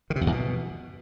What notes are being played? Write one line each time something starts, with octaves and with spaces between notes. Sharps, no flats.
D#3
C3
F2
E2
B2